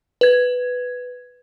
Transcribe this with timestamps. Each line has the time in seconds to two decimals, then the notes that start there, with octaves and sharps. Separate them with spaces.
0.21 B4 G#6